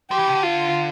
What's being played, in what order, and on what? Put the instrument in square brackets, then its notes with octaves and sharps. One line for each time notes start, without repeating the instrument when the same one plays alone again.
[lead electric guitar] F3 [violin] G4
[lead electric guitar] E3
C3
D3
[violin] F4